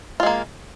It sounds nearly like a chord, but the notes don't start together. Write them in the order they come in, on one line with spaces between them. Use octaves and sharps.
F4 G#3 A#3